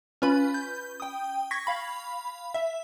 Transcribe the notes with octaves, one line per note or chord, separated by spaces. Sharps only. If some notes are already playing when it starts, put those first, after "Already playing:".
C#4 F4 B4 B5
G6
G5 D#6
C#6 G#6 A#6 B6
F5 B5
E5